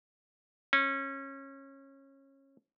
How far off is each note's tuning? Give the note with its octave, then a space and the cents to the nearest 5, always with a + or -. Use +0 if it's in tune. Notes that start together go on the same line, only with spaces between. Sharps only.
C#4 -25